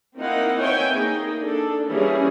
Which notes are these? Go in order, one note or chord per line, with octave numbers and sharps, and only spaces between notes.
A#3 C4 D#4 E4 F5 F#5
C4 B4 C#5 E5 G5 G#5
A#3 D#4 G#4
D4 A4
E3 G3 A#3 C#4 E4 G#4